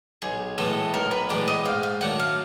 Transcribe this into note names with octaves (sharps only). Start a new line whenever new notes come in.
B1 G#4
A2 E3 G#3 B3 A4
B1 A#4
B4
A2 E3 G#3 B3 D5
D#5
G#2 F5
F5
D#3 F#3 A3 D4 F#5
F5